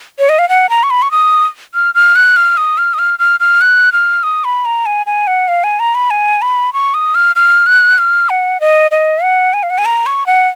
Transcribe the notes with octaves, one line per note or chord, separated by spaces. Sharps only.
C#5
D#5
F5
F#5
A#5
C#6
B5
C#6
D#6
F6
F6
F#6
F6
D#6
F6
D#6
F6
F6
F6
F#6
F6
D#6
B5
A#5
G#5
G#5
F#5
F5
G#5
A#5
B5
G#5
B5
C#6
D#6
F6
F6
F#6
F6
F#5
D#5
D#5
F#5
G#5
F5
F#5
G#5
A#5
C#6
F#5